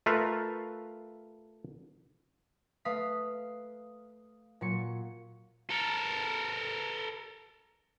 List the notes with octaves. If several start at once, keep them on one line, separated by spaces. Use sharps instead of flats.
A3 F4 A#4 B4 E5 F5
A3 B4 F5 D#6 B6
A#2 F#3 C#7
A4 A#4